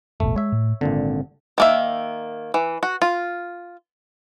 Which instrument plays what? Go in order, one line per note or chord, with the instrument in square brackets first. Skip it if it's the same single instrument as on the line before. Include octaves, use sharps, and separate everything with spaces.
[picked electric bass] E1 A1 B2 [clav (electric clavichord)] A3
[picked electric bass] G#3 [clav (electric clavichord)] C#5 E5
[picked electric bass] A2
[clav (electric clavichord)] G#1 A#2 D3 [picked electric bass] C4
[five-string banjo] D#3 A#3 E5
E3
F#4
F4